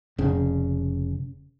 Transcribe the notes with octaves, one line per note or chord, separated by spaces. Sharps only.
F1 C#3